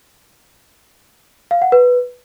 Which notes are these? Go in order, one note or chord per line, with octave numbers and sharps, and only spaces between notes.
F5
F#5
B4